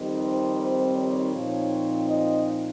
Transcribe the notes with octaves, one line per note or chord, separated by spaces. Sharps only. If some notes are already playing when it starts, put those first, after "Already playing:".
Already playing: F2 D#3 G3 C4 D#4
C5
C5
C#5
A#2 F3 C4 D#4
D#5